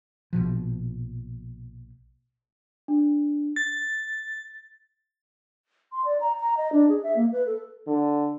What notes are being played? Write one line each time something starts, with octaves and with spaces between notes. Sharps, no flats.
A#1 B2 F3
D4
A6
C6
D5
A#5
A#5
D#5
D4
G#4
E5
A#3
B4
A4
D3